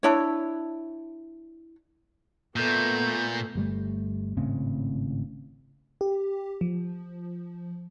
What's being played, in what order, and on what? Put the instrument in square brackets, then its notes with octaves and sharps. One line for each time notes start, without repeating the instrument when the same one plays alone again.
[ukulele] D4 E4 C#5
[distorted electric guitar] A#2 [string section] A3 B3 [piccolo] G6
[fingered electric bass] G1 G3 A3
G#1 A2 C#3 C4
[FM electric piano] G4
F3